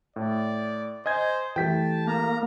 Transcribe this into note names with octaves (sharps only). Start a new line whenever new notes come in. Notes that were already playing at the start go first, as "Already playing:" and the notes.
A2 D5
C5 D#5 G#5 G#6
E3 G3 A3 G5 A5 B6
A#3 A#5